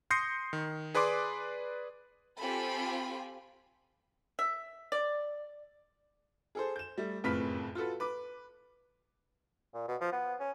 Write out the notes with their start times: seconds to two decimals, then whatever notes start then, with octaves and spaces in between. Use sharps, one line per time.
0.11 C6 D#6 G6 A#6 C7 C#7
0.53 D#3
0.95 G#4 B4 D5 C6 D6
2.39 C4 F4 G4 A4 G#5 B5
4.39 E5
4.92 D5
6.55 G#4 A4 C5
6.76 G6 E7
6.98 G3 A3
7.24 F#1 F2 A2 B4 F6 B6
7.75 F4 F#4 A4 B4
8.00 B4 D6
9.74 A#2
9.88 B2
10.01 F3
10.12 B3
10.40 C#4